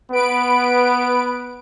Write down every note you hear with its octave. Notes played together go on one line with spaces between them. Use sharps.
B3 B4 D7